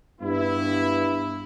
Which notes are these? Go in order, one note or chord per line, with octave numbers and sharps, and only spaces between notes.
G2 B3 E4